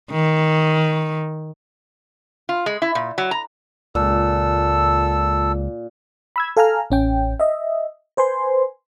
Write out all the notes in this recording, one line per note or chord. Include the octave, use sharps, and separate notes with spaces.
D#3
F4
G#3
E4
A#2
F#3
A#5
C#2 A#2 A4 E6
B5 E6 G#6
A4 F5 G#5 A#5 F6
A1 C#4 G5
D#5 E5
B4 C5 G#5 C6